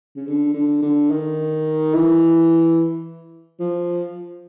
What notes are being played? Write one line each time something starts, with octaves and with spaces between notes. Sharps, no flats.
C#3
D3
D3
D3
D#3
E3
F3